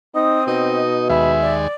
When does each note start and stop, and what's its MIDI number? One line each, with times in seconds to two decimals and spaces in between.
0.15 0.83 60
0.15 0.41 63
0.15 0.47 87
0.48 1.51 47
0.48 1.08 63
0.48 0.96 75
1.10 1.68 39
1.10 1.68 56
1.10 1.58 76
1.10 1.32 83
1.41 1.75 74